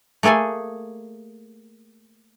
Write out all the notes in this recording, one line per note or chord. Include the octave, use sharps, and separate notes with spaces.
A3 A#3 G#4 A4 G#5